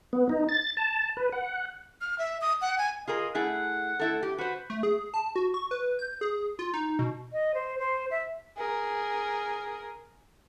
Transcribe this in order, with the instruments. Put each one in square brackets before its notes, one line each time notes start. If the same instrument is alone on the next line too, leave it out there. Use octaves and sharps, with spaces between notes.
[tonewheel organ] B3
D#4
A6
A5
B4
F#5
[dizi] F6
E5
D#6
F#5
G#5
[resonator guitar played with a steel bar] F4 G#4 A#4 [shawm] D#5
[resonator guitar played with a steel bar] A3 E4 G#4 [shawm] F#5
[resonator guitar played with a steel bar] A3 E4 A4
G4
[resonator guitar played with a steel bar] F#4 C5 [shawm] B4
[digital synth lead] A3
G#4
A5
F#4
C#6
B4
G6
G#4
F4
D#4
B2
[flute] D#5
C5
C5
E5
[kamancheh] G#4 A#4